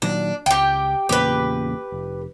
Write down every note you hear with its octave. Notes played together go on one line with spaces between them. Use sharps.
A#2 D#3 F#3 D4
C#2 G4 G5
E2 A#2 C#3 G4 B4
F1